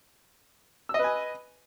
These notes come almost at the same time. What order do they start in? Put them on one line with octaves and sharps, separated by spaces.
E6 D#5 B4 G#5